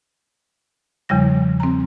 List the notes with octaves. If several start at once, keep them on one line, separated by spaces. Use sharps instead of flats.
E2 C#3 F3 G3 A#6
C4 A#5